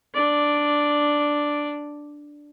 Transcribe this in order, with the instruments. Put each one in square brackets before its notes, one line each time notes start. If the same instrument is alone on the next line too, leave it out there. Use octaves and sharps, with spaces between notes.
[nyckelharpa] D4 D5